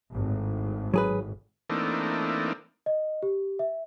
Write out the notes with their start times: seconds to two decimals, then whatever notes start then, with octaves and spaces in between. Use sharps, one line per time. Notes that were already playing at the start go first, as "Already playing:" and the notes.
0.11 G#1 A2
0.94 F#3 G#4 B4
1.70 E3 A3 A#3 C4 D4 D#4
2.86 D#5
3.23 G4
3.59 E5